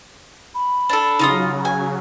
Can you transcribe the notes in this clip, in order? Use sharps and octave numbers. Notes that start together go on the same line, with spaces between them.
B5
D4 A4
C#3 F#3 D#4 F4 D#6
G#5